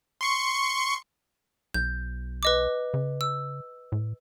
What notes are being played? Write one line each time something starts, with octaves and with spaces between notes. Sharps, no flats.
C6 C#6 C#7
B1 G6
B4 D#5 D6
C#3
E6
A2